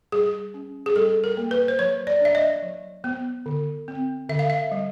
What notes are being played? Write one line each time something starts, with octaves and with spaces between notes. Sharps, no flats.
G3 G#4
C#4
G#4
G3 A4
A#4
A#3
B4
C5
F#3 C#5
D5
D4 E5
D#5
F#3
B3
D3
C4
D3 E5
F5
E5
G3